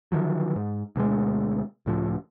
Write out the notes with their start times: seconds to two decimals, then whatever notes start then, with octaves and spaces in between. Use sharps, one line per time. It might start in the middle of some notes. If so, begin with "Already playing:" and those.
0.12 D3 D#3 F3 F#3
0.56 G#2
0.96 D2 B2 F#3 G#3
1.86 C#2 A2 F3